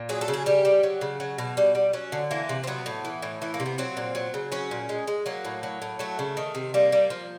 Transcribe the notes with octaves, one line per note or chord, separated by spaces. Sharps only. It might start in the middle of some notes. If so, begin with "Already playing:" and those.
Already playing: A#2
F#3 G#4
A4
C#3
G#4
G3 G4
G3
F#3
C#3
F#3
B2
G3
G3
F#3 C#4
D3
E3 A#3
C3
C4
F#3 B3
A2
E3
A2
E3 A3
A#3
C3
B3
F#3 C4
A#2
F#3
C#3
F#3 C#4
A#2
G#3
G#3
F#3 A#3
A2
F#3
A2
F#3 A3
C#3
D#3
C3
G3 A#3
G3
F3